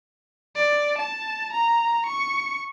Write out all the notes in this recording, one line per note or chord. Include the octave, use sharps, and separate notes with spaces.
D5
A5
A#5
C#6